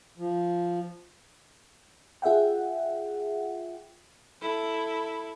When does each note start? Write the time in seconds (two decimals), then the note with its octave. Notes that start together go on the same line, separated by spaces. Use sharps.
0.18 F3
2.22 F4 G#4 E5 F#5 G5
4.41 E4 A4